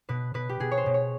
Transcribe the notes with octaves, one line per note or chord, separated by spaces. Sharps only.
B2 B4
B2 B4
G4
B2 G#4
C#5
C5
B2
C#5